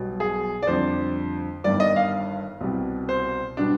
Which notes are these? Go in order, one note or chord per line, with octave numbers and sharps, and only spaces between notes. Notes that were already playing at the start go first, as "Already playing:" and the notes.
Already playing: B1 B2 G3
G#4
D5
F2 D3 G3 C5
G1 G2 D#3 G3 D5
D#5
F5
C2 B2 G3
C5
B2 G3 D4